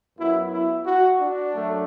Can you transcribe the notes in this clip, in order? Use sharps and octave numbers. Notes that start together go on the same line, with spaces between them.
F#2 F#3 B3 E4
E4
F#4
D4
F#2 F#3 A3